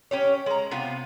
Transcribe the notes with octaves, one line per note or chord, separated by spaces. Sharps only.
C#4 G4 C#5
G#3 A#5
C3 B3 F4